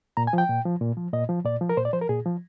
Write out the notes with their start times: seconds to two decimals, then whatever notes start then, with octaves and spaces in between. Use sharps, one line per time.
0.17 A#2 A#5
0.27 G#5
0.33 F3 G5
0.49 A#2
0.65 F3
0.81 A#2
0.97 F3
1.13 A#2 D#5
1.29 F3
1.45 A#2 D5
1.61 F3
1.69 A#4
1.77 A#2 C5
1.85 D5
1.93 F3 C5
2.01 A#4
2.09 A#2 G#4
2.26 F3